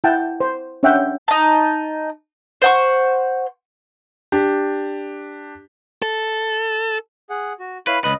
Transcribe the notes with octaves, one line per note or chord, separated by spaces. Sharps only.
E4 F#5 G5 A5
C5
C#4 D4 C#5 E5 F#5 G5
D#4 A5
C5 F#5 C#6
D4 G4
A4
G#4 F#5
F#4
E4 B4 C#5 F5
C#2 B4 D#5